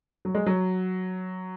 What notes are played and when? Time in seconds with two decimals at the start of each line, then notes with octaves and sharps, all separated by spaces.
0.25 F#3
0.35 G#3
0.46 F#3